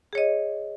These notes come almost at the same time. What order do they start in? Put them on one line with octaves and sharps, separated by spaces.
G#4 C#5 D#5